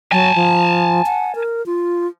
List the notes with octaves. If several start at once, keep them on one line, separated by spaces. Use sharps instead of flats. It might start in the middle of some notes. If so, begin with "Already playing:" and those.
F#3 G#5 A5
F3
F#5
A#4
F4